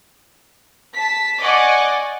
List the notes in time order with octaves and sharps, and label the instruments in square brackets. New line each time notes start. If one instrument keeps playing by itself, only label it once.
[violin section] A5 B6
D5 D#5 F#5 G#5 C#6 D6